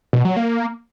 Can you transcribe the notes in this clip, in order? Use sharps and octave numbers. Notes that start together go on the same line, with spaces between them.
B2
F#3
A#3